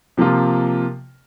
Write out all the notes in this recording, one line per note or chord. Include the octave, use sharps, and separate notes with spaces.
C3 F3 A#3 F4